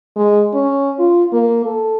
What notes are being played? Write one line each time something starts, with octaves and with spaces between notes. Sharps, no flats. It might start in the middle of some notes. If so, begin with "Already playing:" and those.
G#3
C#4
F4
A#3
A4